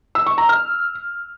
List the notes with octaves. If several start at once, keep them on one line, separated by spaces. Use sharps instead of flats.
E6
C#6
A#5
F6